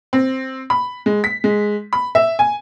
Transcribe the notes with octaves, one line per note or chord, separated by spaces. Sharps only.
C4
B5
G#3
B6
G#3
B5
E5
G#5